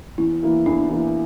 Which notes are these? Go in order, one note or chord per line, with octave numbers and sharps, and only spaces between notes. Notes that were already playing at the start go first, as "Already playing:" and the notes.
E2 E4
E3 A#3 E4
E2 D4
E3 A#3 E4